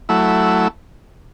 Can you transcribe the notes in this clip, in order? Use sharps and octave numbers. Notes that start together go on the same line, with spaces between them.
F#3 A3 E4